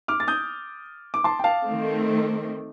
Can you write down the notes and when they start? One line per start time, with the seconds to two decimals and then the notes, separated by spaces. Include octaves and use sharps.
0.08 D6 F6
0.20 A6
0.28 D#6 G6
1.14 D6
1.24 A5 C6
1.39 G5
1.44 F5 A5
1.63 D#3 A3 C4